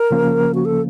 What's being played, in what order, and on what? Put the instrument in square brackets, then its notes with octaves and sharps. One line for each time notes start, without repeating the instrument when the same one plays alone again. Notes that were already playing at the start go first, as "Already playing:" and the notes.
Already playing: [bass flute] A#4
[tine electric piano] C#3 F3 A#3 C#4
[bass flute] F#4
A4